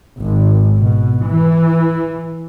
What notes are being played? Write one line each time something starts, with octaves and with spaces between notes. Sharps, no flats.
G#1
B2
E3